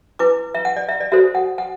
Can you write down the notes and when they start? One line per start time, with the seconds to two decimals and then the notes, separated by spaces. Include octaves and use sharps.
0.19 E4 B4 D6
0.55 E5
0.65 F#5
0.77 D5
0.89 E5
1.00 D5
1.12 F#4 A4 C5 E5
1.35 F#5
1.58 F#5